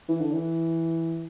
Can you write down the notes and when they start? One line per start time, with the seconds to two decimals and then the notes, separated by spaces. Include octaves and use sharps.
0.09 E3
0.20 D3
0.33 E3